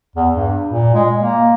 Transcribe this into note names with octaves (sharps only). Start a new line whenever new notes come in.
E2
G2
A#2
G#3
A#3